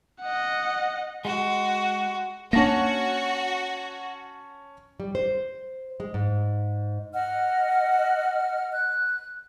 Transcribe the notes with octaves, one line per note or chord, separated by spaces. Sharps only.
D#5 F#5
G#3 F#4
A#3 C#4 D4 F#4 A5 A#6
G3
C5
G#3
G#2
D#5 F#5 F6
F#6